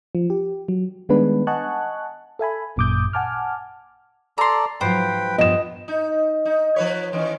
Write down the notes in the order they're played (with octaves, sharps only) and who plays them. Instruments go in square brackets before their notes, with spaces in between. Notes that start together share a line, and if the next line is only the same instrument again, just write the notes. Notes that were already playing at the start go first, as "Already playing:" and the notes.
[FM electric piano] F3
G4
F#3
D#3 G3 G#3 B3 D4 B4
D#5 F#5 G#5 A5 C#6 F#6
A4 E5 G#5 B5
G#1 F#2 A#2 D6 D#6 G6
F#5 G#5 A5 D6 F6
[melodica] A4 D5 [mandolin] A#5 C6
[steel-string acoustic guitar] G#2 F3 F#3 [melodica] B4 G5 [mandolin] C5
[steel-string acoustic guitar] G2 F3 B3 [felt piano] D#5 E7
[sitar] D#4
D#4
F3 B4 C#5
D#3 E3 C#4